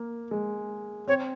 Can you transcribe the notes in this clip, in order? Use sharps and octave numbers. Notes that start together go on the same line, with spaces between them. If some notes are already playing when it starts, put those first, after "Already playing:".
Already playing: A#3
G#3
C4 C#5